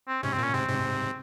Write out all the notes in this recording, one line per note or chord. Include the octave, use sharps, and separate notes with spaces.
C4
G#2 C3 C#4
C4
A#2
C#4
G#2 C3 C4
G#2 C3